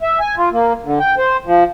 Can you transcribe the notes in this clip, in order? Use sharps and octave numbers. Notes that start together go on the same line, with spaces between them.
E5
G#5
F4
A#3
D3
G5
C5
F3